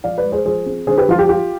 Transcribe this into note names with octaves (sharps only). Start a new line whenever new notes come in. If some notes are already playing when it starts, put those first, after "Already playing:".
F3 D5 F5
B4 D5
G#3
G#4 C5
F3 G#4 C5
C4
D3 G#4 C5
G4 B4
F3 F4
G4
F4 G4